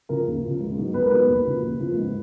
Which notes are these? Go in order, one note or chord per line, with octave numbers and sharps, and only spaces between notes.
C#3 F3 A#4
D#2
C#3 F3
C#2
B2 F#3 B3 D#4
C#2 B4
A#4
B2 F#3 B3 D#4 B4
D#2
C#3 F3 A#3
D#2
C#3 F3 A#3
G#2